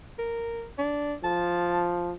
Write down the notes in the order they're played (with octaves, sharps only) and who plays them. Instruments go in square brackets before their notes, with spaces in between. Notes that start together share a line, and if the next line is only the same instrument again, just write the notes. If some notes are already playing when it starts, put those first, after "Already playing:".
[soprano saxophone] A#4
D4
[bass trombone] F3 [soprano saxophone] A5